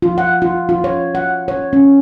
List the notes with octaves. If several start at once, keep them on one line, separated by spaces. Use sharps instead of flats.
F4
F#5
F4
F4
C#5
F#5
C#5
C#4